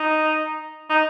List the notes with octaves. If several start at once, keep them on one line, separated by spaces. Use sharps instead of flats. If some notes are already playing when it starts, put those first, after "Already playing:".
Already playing: D#4
D#4